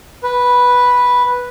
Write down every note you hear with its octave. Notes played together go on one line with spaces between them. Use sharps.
B4